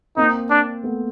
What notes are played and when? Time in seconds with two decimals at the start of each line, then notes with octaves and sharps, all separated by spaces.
0.16 A#3 C4 D#4
0.50 D4
0.84 A3 B3